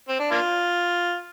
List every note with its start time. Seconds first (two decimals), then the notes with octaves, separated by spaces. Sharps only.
0.09 C4
0.20 D4
0.31 A#3 D4 F4